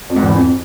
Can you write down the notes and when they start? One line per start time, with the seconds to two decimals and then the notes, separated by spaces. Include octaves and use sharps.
0.10 F2
0.16 G#2
0.22 E2
0.29 E3
0.35 F2